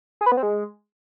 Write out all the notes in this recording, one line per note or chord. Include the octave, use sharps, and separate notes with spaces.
G#4
B4
B3
C4
G#3